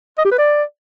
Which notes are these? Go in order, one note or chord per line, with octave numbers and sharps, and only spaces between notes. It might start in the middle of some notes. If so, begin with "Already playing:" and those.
D#5
G4
B4
D5